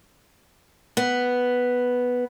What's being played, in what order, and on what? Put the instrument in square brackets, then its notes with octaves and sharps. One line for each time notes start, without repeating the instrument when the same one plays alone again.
[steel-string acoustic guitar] B3